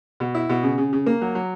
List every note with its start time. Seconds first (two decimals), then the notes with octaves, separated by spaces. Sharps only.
0.20 B2
0.35 E4
0.50 B2
0.63 C#3
0.78 C#3
0.93 C#3
1.06 A#3
1.21 F#3
1.35 F#3